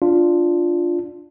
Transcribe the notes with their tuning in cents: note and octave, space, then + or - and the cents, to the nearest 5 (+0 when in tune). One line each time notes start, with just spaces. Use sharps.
D4 +0 F4 +0